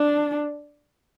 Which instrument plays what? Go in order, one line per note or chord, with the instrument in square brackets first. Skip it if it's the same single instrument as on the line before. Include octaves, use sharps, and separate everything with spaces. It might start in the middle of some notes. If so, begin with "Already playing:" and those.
Already playing: [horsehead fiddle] D4